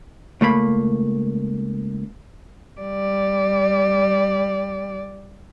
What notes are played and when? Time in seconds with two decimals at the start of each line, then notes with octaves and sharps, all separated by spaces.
0.41 C#2 A3 A#3 B5
2.81 G3 D5